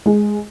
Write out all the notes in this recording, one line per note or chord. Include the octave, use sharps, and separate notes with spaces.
G#3